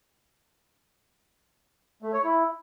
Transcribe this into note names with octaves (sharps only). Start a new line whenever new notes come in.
A3
C#5
E4